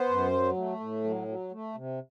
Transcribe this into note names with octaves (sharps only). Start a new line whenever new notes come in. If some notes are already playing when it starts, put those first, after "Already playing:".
Already playing: B3 C5
F#2
F#3
A3
A2
F#3
F#3
A3
C3